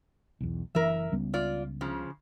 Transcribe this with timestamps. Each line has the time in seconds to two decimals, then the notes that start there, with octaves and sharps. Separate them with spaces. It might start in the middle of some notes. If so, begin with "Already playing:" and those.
0.41 B1 E2
0.75 F#1 E3 A#4 E5
1.12 C#2 G3 B3
1.34 F4 D5
1.81 C#3 F3